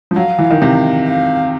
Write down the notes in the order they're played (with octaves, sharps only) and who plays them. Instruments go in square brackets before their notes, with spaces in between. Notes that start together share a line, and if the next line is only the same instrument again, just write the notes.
[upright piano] F3
[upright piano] F#3 [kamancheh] F5
[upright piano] E3
D#3
[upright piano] C3 [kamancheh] F5
[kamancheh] F5